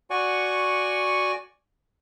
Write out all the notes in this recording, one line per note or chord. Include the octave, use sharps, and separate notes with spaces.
F#4 D5 F#5 G#5 C#6